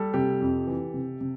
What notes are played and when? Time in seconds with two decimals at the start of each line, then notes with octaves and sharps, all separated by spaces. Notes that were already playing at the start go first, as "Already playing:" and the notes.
Already playing: G3 G4 A4
0.14 C3 G4
0.41 F2
0.67 E3
0.94 C3
1.21 C3